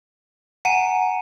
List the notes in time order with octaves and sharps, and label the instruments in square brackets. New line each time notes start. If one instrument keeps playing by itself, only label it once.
[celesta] F#5 D#7 [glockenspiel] G#5 A#5 C#7